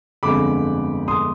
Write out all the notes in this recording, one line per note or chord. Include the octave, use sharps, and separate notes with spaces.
G1 F2 D3 F3 G#3 B5 D6
C6 D#6